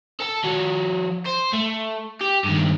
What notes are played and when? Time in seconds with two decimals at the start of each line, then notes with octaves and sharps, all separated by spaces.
0.20 A4 A5
0.45 F3 F#4
1.26 C5
1.53 A3
2.21 G4
2.44 G2 D#3